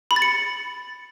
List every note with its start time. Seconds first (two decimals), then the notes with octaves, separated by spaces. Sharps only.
0.11 B5
0.16 A6
0.22 C#7